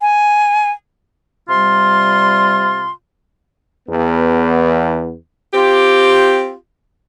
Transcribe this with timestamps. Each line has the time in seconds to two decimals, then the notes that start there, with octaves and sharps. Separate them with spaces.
0.01 G#5
1.48 C3 G3 F4 C6
3.89 E2 B3
5.54 C4 F4 G4